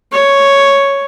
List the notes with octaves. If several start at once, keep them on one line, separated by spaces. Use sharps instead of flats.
C#5